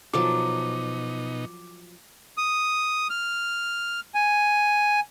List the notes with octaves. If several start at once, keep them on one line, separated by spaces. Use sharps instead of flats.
B2 F3 F#3 D#4 A4 D6
D#6
F6
G#5